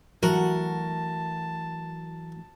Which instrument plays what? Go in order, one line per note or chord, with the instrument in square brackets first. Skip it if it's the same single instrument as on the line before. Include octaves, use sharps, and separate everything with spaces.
[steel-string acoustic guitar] E3 F#3 A3 [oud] F#4 [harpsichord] A#4 [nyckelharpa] A5